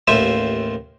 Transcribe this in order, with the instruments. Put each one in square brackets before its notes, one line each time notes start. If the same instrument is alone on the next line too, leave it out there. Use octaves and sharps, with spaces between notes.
[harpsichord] A1 D#2 F4 C5 E5 G#5